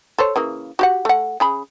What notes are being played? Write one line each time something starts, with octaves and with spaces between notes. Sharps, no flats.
A4 C5 C#5
C#3 E3 A#3
F#4 G4 F#5
A3 F#5
C#3 G#4 B5